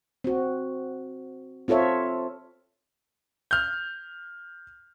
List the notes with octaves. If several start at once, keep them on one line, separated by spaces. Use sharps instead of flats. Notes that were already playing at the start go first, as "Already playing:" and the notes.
C4 F#4
C4 F4 A4 C#5 E5
F6 G6